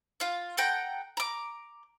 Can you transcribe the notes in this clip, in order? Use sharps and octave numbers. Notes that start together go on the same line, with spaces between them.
F4 F5
A4 F#5 G5 A#5
A#5 D6